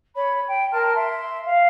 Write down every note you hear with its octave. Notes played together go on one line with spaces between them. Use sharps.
C#5 B5
G5
A#4 A5 C6 F6
E5 C6
F5